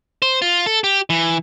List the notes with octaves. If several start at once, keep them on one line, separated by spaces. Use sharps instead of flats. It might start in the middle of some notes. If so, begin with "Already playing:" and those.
C5
F4
A4
G4
E3